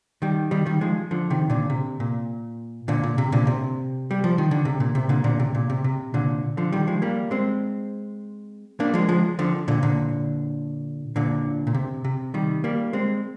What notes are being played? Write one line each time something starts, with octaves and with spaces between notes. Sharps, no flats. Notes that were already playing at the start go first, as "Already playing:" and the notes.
D#3 G3
D#3 G3
D#3 G3
F3 G#3
D3 F3
C3 D#3
A#2 D3
C3
A#2
A#2 D3
A#2
C3
A#2 D3
C3
G3
F3
D#3
D3
C3
A#2
C3
A#2 D3
A#2 D3
C3
A#2
C3
C3
A#2 D3
D3 F3
D#3 G3
F3 G#3
G3 A#3
G#3 C4
A#3 D4
F3 G#3
F3 G#3
D3 F3
A#2 D3
A#2 D3
A#2 D3
A#2
C3
C3
D#3 G3
G3 A#3
G#3 C4